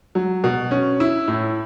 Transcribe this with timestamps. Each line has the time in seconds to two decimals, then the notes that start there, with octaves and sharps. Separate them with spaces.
0.15 F#3
0.44 B2
0.71 C#4
1.00 E4
1.28 A2